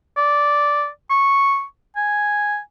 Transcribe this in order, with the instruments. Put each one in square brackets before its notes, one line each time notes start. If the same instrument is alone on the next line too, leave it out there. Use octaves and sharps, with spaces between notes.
[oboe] D5
C#6
G#5